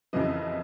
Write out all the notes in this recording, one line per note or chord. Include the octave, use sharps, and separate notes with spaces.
F#1 F2 C#3 E3 D#5